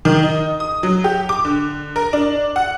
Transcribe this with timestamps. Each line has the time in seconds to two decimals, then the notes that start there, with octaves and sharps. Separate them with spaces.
0.05 D#3
0.23 D#4
0.60 D#6
0.83 F#3
1.04 G4
1.29 D6
1.45 D3
1.96 A#4
2.13 D4
2.56 F#5